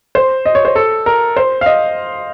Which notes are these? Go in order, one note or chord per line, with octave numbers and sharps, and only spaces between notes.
C5
D#5
C#5
C5
A4
A#4
C5
F5
D#5